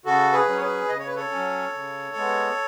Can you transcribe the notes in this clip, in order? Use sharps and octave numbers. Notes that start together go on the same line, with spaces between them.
C#3 F#4 A4
G#4 B4
F#3 C#4
C#5
G#4 B4
C#3 D#5
C#5
B4
A4 C#5
F#3 C#4
C#3
G#3 B3